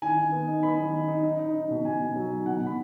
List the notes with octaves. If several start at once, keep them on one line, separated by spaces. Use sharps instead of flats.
D#3 G#5
D#3
B3
D#4
B3 B5
D#3
D#4
D#4
D#4
D#4
D#4
B2
B2 G#5
B2
F#3
D#4
B2 F#5
B2
B5